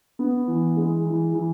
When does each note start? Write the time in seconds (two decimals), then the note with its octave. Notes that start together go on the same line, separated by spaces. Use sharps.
0.19 B3
0.48 E3
0.77 G#3
1.05 E3
1.34 E3